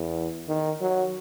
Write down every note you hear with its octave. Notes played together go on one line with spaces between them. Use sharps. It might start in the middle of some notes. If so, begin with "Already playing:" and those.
Already playing: E2
D#3
F#3